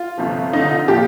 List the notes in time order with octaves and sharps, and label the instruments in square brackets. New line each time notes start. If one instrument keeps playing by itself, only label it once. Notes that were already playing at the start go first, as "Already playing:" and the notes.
Already playing: [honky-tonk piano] F4
G1 F2 C3 F3
F1 F2 D3 D#4
F4
A#2 F3 G4